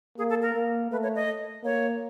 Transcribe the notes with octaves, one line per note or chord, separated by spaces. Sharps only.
A#3 G#4
A4
A#4
A#3
A3 B4
C#5
D#5
A#3 C#5